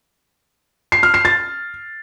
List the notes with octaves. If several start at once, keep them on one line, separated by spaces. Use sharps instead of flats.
C7
F6
C7
A6